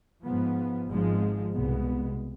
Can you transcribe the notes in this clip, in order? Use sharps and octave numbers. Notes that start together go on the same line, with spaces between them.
G#2 F3 B3
G#1 G#2 F3 G#3
C2 B2 G#3 B3